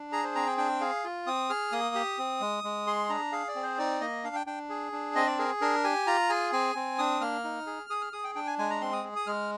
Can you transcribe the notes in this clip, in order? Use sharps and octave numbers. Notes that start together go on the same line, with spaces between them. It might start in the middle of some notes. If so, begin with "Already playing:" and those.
Already playing: D4
G#4 A#5
C5
C4 A#5
G5
D4 G5
G#4 F5
F4
C4 D#6
G#4 F6
A#3 D#6
G4
C4
G#3
G#3
G#4 C6
D4 A#5
G#4 F5
D5
C4
C5
D#4 D5
A#3 D#5
D4 F5
G5
D4 G5
G#4
D4
C4 D#5
D5
G#4 A#4
D4 A#4
G4 G#5
F4 A#5
G#4 G#5
C4 G#5
C4
D4 D#6
A#3 F6
D#4
G#4
G#4 D#6
F6
G#4 D#6
G5
D4 G5
G#5
G#3 G#5
A#5
C4 C6
D#6
G#4
D#6
G#3 F6